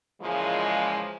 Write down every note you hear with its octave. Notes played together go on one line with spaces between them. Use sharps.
A#2 C#3 E3 F3 G#3